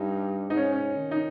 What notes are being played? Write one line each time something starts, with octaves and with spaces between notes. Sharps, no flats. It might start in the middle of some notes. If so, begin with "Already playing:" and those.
Already playing: G2 D#4
G#2 D#4
C#4
C#4
D#3
D#4